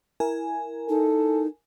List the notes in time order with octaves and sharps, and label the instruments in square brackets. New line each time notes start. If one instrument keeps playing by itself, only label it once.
[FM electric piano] E4 A#4 G#5
[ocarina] D#4 [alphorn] A4